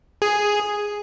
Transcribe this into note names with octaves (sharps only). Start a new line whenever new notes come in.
G#4